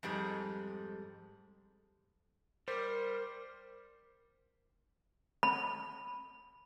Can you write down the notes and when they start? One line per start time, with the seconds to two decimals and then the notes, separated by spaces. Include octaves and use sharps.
0.03 F2 G#2 G3 G#3
2.68 G3 A#4 C5
5.43 B5